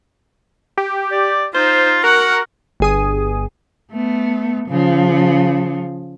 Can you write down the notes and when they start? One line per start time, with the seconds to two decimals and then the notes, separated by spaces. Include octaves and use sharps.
0.77 G4
1.11 D5
1.54 D#4 F4 C5
2.04 F#4 A#4 F#5
2.80 G1 G#4 D#6
3.91 A3 B3
4.69 C#3 F3